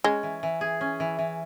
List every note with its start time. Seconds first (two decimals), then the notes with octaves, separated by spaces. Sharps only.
0.04 G#3 C#4
0.23 E3
0.43 E3
0.61 G#4
0.81 C#4
1.00 E3
1.19 E3